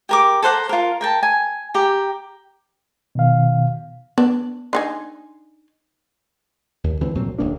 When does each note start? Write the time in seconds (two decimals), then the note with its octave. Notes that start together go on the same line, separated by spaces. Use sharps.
0.09 G4 A#4 D6
0.42 A4 C5 F#5 A#5
0.69 F4 A#4
1.01 A#4 G5 A5
1.23 G#5
1.74 G4 G5 A#5
3.15 B2 D#3 F5
4.18 B3 D4
4.73 D4 D#4 G#5 C6
6.84 D#2
7.01 C#2 E3 C4
7.15 C2 A#2 F#3 C4
7.39 D#1 C2 A#3 D4